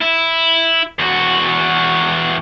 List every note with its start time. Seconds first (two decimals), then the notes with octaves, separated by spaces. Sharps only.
0.01 E4
0.99 E2 F#4